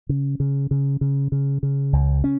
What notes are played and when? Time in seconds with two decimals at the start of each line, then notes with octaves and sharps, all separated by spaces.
0.09 C#3
0.40 C#3
0.71 C#3
1.01 C#3
1.32 C#3
1.63 C#3
1.93 C#2
2.24 C#4